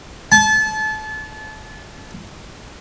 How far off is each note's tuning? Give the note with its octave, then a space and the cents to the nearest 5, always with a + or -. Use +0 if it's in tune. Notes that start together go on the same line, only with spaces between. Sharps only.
A5 -30